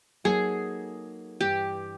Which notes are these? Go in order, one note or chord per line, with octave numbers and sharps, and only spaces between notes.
F#3 A#3 D#4 F#4 G#4 A4
G2 E3 G3 G4